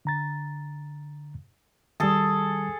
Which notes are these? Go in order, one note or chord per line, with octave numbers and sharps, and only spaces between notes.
D3 A#5 A6
D#3 G3 G#4 A4